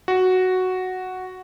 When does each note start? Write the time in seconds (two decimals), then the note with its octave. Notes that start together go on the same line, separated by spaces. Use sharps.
0.08 F#4